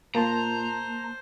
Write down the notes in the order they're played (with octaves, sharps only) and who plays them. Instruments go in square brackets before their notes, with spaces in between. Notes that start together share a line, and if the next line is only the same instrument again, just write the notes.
[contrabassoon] A#2 [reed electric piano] A#3 A5 C6 [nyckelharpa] C5 [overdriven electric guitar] A#5